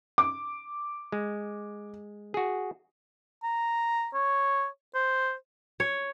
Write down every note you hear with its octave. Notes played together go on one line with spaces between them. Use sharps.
D6
G#3
F#4 G#4
A#5
C#5
C5
C#5